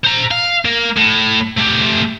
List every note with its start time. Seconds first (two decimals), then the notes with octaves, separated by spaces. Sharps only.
0.05 C5 A#5
0.31 F5
0.65 A#3
0.96 A2
1.57 A3 G4